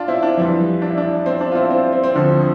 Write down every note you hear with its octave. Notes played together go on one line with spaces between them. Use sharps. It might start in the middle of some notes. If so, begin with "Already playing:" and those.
Already playing: D4 F4
C4 E4
D4
F2 E3 G3
D4
E4
D4
C4
D4
F4
C4 E4
C4
C4
C4
D2 D3 F3